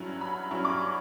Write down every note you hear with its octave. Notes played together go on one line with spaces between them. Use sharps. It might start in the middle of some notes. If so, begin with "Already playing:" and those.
Already playing: G2 F#3 C#4 E4
B5
G2 F#3 C#4 E4 C#6
D6
C#6